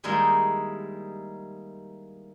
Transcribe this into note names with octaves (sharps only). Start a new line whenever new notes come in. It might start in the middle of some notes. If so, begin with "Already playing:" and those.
D#3 G3 G#3 A#3 D#4 E4